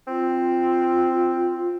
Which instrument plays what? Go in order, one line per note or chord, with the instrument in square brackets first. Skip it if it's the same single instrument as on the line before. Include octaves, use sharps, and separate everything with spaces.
[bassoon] C4 [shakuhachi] F4